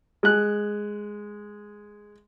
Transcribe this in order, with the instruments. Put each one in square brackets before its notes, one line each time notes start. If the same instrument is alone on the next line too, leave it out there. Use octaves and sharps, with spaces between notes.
[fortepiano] G#3 F#6